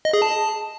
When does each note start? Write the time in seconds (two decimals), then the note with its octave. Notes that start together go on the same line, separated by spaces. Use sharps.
0.05 D#5
0.13 G#4
0.22 A5